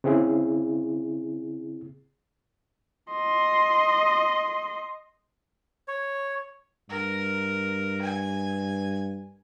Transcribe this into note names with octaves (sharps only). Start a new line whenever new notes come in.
C#3 C4 E4 G#4
D#5 C6
C#5
G2 A#4
G#5